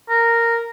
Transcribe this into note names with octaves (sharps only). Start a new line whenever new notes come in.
A#4